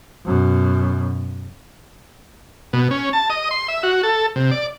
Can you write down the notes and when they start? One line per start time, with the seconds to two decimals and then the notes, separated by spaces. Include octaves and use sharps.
0.25 F#2 B2
2.73 B2
2.91 C#4
3.13 A5
3.30 D#5
3.51 C6
3.68 E5
3.83 F#4
4.03 A4
4.36 C3
4.51 D5